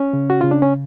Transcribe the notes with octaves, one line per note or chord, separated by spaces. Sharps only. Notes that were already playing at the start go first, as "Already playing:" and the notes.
Already playing: C#4
C#3
F#4
C#3 F4
D4
C#4